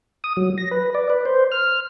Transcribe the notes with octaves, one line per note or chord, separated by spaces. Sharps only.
D#6
F#3
A#6
B4
D5
B4
C5
F6